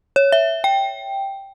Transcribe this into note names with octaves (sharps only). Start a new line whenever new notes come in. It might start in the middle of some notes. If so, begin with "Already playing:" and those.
C#5
E5
G5